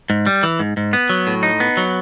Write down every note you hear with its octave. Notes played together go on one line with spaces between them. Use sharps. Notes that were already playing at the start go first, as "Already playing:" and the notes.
G#2
G3
E3
G#2
G#2
B3
F#3
A2
D#4
B3
F#3